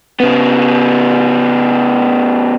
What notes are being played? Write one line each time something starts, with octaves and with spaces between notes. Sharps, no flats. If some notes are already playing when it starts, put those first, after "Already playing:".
C#3 B3